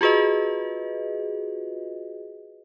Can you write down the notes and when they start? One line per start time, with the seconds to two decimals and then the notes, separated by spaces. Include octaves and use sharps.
0.01 F4 F#4 G#4 B4 D#5